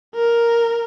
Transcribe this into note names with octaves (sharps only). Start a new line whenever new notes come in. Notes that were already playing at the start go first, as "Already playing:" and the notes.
A#4